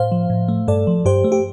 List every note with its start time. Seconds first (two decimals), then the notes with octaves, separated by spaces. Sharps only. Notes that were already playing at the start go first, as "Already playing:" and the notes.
Already playing: A2 C5 F5
0.12 F3
0.30 A2
0.48 A3
0.68 G2 A4 D5
0.87 F3
1.05 G2 G4 C5
1.24 A3
1.32 G4